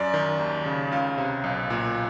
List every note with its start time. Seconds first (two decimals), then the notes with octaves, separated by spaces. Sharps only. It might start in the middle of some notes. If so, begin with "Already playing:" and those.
Already playing: F#2 D5
0.14 D#3
0.39 D#2
0.66 C#3
0.92 C#2 F5
1.18 C3
1.44 B1
1.70 A#2